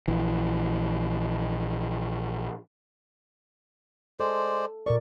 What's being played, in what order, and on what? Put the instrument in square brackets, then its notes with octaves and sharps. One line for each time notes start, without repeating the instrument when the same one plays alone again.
[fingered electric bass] A#1 E3
[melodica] G#3 C5 D5 [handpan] A4
[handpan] A#2 A#4 D5 [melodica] C#6